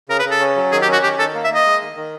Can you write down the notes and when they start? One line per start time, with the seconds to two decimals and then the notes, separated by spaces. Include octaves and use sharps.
0.09 C#3 A#4
0.19 B4
0.25 C#3
0.31 A4
0.40 C#4
0.56 F#3
0.72 D#3 G#4
0.82 G4
0.88 C#4 F#4
1.03 D#3 G4
1.19 D#3 A4
1.35 A#3
1.44 E5
1.50 A#3 D#5
1.66 G#3
1.81 D#3
1.96 D#3